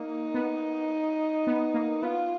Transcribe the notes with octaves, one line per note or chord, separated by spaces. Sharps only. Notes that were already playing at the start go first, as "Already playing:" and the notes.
Already playing: A#3 D#4
B3
B3
A#3
B3 F4